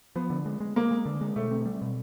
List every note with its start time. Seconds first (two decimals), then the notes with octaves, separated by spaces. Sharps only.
0.16 F3 B3
0.30 D3
0.46 G#3
0.60 G#3
0.76 G#3 A#3
0.91 G#3
1.06 D3
1.21 G#3
1.36 B2 A3
1.51 C4
1.65 G3
1.82 B2